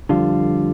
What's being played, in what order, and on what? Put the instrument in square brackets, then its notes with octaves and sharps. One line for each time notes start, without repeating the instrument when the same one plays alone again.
[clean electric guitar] F2 D3 G3 F4